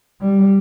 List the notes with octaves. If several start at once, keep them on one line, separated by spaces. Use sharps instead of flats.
G3